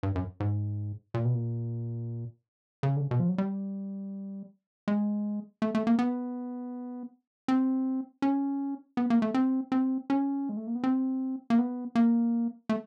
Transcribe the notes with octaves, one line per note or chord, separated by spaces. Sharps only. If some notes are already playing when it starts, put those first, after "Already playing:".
G2
F#2
G#2
A#2
B2
A#2
C#3
D3
C#3
B2
F3
F#3
G3
G#3
A3
A3
A#3
B3
C4
C#4
B3
A#3
A3
C4
C4
C#4
G#3
A3
A#3
B3
C4
A#3
B3
A#3
A3